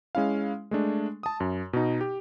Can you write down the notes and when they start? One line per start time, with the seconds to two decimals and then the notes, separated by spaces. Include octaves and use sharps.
0.15 G#3 C#4 E4 F5
0.71 G#3 A3 D4
1.23 A5 D#6
1.40 F#2
1.73 B2 D#4
2.01 G4